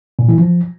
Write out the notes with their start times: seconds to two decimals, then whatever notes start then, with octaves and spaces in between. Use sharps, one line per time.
0.19 A#2
0.29 E3
0.38 F3